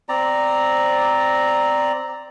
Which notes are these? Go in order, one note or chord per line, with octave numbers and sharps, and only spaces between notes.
C4 D5 A#5